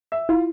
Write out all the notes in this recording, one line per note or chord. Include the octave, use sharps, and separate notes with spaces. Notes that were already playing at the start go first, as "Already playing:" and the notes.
E5
E4 F4